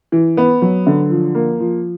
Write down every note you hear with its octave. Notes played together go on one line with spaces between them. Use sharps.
E3
B3
F#3
D3
F3
A#3
F3